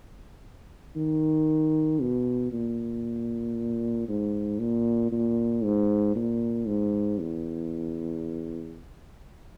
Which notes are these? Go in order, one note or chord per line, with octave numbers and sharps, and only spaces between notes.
D#3
B2
A#2
G#2
A#2
A#2
G#2
A#2
G#2
E2